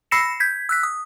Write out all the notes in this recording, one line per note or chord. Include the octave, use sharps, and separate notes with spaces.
B5 E6 A#6 C7 C#7 E7
G6 G#6 B6
E6 F#6 B6
D#6